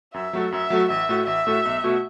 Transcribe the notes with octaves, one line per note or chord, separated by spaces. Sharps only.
F#2 E5
F#3 A3 F#4 A4
F#2 E5
F#3 A3 F#4 A4
A1 E5
A2 A3 F#4 A4
A1 E5
A2 A3 F#4 A4
B1
B2 A3 F#4